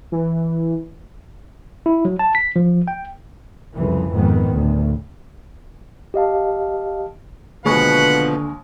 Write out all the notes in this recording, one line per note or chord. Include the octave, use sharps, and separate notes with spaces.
E3
E4
F#3
A5
B6
F3
G5
C2 F2 C#3 E3
F2 G#2 D#3 B3
D2 A2
G4 D#5 F5 A5
D#2 B2 D3 F3 G#3 B4 F#5 C#6